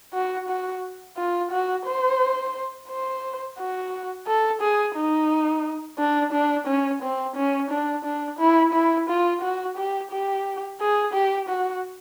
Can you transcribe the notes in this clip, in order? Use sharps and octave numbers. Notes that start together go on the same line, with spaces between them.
F#4
F#4
F4
F#4
C5
C5
F#4
A4
G#4
D#4
D4
D4
C#4
C4
C#4
D4
D4
E4
E4
F4
F#4
G4
G4
G#4
G4
F#4